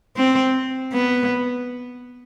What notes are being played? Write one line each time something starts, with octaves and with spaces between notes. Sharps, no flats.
C4
B3